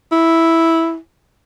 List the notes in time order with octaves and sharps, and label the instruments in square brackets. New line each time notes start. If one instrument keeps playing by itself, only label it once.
[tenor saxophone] E4